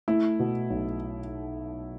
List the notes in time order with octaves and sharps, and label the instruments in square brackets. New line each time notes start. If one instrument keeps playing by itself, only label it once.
[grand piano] A3 E4
B2
B1